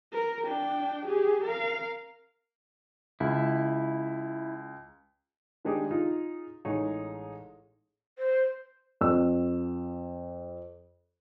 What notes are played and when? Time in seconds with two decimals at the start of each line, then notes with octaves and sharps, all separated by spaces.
0.13 A#4
0.45 D4 G5
1.05 G4 G#4
1.44 A#4 F5
3.20 C#2 E4
5.65 D#3 G#3 D4 D#4 G4 G#4
5.90 D#4 F4 G#4
6.65 A1 G#3 D#4 G#4 C#5
8.19 C5
9.01 F2 E6